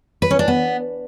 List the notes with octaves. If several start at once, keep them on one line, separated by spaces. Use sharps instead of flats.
B4
C#4
D4
B3